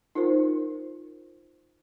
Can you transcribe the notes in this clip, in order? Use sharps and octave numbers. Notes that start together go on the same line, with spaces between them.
D#4 F4 A#4 C5